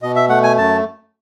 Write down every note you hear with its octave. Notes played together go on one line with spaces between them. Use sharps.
B2 D#5
E5
A3 F#5
G#5
F#2 A5